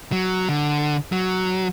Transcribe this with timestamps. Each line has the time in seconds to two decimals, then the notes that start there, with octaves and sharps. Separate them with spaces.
0.12 F#3
0.49 D3
1.12 F#3